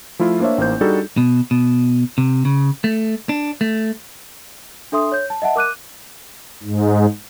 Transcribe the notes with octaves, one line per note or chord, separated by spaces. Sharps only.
F3 A3 E4 F4
A#3 D4 C5 C#5 E5
A1 A#3 D#4 C5 G6
G3 D4 D#4 F#4 G#4 A4
B2
B2
C3
C#3
A3
D4
A3
D4 A4 E5 C6 D#6
C#5 G6
A5
D#5 E5 F#5 A5
A#4 D6 F#6 D#7
G#2